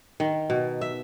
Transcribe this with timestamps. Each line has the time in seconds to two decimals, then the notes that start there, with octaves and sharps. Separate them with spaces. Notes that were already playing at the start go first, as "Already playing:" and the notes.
0.20 D#3
0.50 B2
0.81 E5